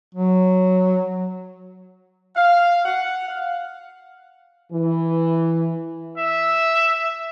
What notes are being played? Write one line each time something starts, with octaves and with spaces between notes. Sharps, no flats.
F#3
F5
F#5
F5
E3
E5